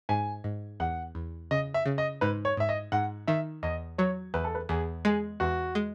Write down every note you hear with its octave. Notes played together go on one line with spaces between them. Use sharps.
G#2 G#5
G#2
E2 F#5
E2
C#3 D#5
E5
C#3
D#5
G#2 B4
C#5
G#2 E5
D#5
G#2 F#5
D#3 E5
E2 D#5
F#3 C#5
E2 B4
A4
B4
E2 G#4
G#3 G#4
E2 F#4
G#3